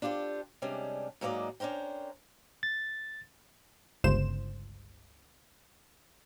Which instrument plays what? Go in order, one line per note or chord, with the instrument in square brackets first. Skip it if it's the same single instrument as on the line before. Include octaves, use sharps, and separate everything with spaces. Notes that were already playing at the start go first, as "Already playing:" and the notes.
[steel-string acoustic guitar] D4 F4 G4 A4 C5
C3 G3 G#3 C#4 D4
G#2 F#3 A#3 C5 D5 D#5
C#4 D4 A#4 C5 G5
[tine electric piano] A6
[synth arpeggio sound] G1 C#2 C5 E7